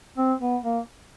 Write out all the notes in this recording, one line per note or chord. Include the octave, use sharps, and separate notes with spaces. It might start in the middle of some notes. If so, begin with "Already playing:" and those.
C4
B3
A#3